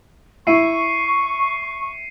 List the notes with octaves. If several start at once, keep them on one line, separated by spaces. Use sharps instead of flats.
E4 C#6 C7 C#7 D#7